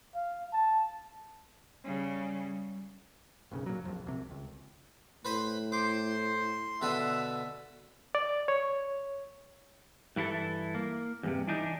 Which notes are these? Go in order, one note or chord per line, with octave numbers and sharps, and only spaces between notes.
F5
A5
C#3 G3
F#1 B1 C#3
A#2 F#3
A#1 F2
C2 C3
C#2
A2 B4 C5 B5
C5 C6 D6
B2 D3 B4 E5
D5
C#5
G2 E3 E4 G#4 A4
A#3
E2 G2 C3
E3 D4 D#4